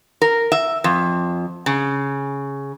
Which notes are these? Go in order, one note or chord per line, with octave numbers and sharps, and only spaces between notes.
A#4
E5
F2
C#3